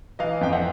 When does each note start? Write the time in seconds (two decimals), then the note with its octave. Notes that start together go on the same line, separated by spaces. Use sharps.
0.19 E3 D#5 F5
0.41 F2 G5
0.52 E5 F#5